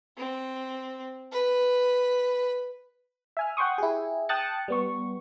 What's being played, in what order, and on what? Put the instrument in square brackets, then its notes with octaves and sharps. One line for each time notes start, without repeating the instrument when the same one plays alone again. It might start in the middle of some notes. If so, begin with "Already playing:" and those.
[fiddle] C4
B4
[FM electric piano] E5 G#5 F6
F#5 G5 C6 C#6 D#6
E4 G4 G#4
G5 A5 D#6 F#6 A6 C#7
G3 B3 C#6